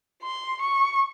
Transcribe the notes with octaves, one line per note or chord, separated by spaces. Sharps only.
C6
C#6